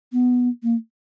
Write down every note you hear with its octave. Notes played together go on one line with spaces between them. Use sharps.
B3
A#3